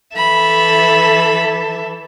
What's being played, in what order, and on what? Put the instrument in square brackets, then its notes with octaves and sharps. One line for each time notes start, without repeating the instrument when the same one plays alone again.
[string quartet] E3 A4 E5 [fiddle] B5